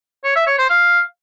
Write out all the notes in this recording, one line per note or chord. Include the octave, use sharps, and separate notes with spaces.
C#5
E5
C#5
C5
F5